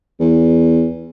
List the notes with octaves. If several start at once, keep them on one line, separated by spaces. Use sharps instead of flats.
E2